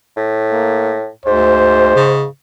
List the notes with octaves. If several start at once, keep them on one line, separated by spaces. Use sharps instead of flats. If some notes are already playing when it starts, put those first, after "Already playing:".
A2
A#3
D2 G#2 C5
C#3